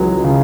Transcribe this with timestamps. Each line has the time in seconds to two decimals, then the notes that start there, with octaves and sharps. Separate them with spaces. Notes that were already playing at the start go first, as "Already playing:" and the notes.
Already playing: C#2 E3 F#3 G#3
0.24 C#3